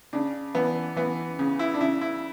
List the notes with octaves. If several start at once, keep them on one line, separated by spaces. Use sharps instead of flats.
C#3 D4
E3 B3
E3 B3
C#3
E4
D4
C#3 E4
E4